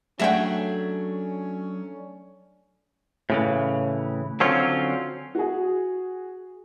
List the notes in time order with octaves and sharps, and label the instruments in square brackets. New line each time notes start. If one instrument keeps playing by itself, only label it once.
[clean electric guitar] F#3 G#4 [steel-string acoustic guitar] A3 D4 [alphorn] C#4 [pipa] E5 F#5 G5
[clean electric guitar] A2 C#3 E3
D3 F#3 C4 C#4 F4
[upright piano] F#4 G#4